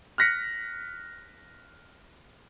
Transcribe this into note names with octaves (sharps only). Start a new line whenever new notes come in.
F6 F#6 A#6 B6 C#7